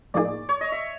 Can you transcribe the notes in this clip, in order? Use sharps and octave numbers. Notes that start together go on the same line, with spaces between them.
A2 F3 A#3 D#4 G#4 D5
C#5
D#5
E5